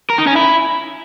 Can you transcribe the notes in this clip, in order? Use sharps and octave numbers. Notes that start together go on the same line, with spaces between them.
A#4
D#4
C#4
E4